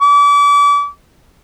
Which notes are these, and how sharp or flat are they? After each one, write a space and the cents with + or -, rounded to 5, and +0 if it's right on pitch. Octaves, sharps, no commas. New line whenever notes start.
D6 -35